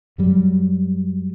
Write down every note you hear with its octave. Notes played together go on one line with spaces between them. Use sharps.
F#2 F#3 G3